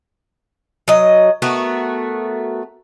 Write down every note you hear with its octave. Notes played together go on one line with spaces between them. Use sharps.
F#3 D#5
A3 B3 F#4 A#4